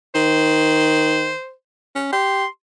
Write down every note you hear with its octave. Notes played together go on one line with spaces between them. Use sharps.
D#3 C5
C#4
G4 C6